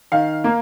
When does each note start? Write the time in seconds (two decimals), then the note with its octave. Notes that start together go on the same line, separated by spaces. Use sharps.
0.12 D#3 F5
0.44 A#3